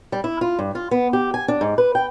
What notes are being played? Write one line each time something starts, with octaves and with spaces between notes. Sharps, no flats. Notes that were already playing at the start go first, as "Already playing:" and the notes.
G3
E4
F4
G2
F4
B3
G4
G#5
D4
G#2
B4
G5